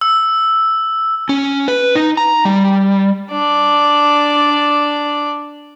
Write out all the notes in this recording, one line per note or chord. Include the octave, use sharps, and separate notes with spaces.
E6
C#4
B4
D#4
A#5
G3
D4 D5